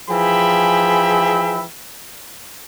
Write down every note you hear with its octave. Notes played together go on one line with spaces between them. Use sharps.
E3 F3 G#4 E5 G5 B5